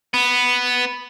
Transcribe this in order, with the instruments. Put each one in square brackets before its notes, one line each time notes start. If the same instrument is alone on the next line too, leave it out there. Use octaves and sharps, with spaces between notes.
[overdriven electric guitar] B3